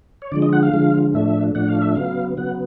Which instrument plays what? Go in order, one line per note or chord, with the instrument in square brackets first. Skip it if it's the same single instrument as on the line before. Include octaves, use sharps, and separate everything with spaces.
[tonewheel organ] C#5
D3 F3 G#3 D5
D#5
F#5
F5
D3 F3 G#3
A2 F3 A3 D4 E5
A2 F3 A3 D4 F#5
F5
E5
C#3 F#3 B3 F5
C#3 F#3 B3 F#5